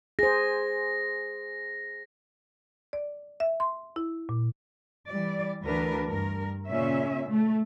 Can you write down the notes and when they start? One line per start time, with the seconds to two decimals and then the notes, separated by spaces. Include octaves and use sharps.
0.19 G#4 C5 A#6
2.93 D5
3.40 E5
3.60 C6
3.96 E4
4.29 A#2
5.07 E3 G3 D5
5.65 D2 E3 D4 A#4 B4
6.07 G2 A#4
6.67 A#2 C#3 C#4 E5
7.28 A3